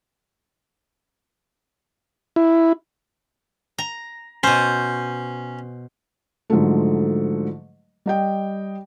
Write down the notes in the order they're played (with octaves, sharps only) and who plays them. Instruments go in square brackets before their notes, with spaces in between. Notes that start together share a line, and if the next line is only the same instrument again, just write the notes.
[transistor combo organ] E4
[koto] A#5
[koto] B2 C5 [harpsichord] C#4
[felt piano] G#2 D3 F3 F#3 A3
G3 D#5 G5